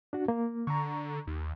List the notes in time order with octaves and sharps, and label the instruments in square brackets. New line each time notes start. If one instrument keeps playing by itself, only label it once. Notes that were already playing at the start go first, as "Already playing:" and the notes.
[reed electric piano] D4 F#4
A#3
[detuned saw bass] D3 [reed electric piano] A#5 C#6
[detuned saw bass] D#2